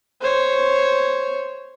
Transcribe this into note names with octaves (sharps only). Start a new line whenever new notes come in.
C5 C#5